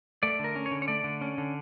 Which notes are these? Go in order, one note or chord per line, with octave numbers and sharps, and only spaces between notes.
A3 D5
D3 A#4
C#4
C#5
D3
C#5
A3 D5
D3
C#4
D3